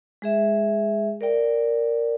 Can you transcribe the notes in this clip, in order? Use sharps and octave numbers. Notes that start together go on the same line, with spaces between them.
G#3 G#4 E5
A#4 D5 G5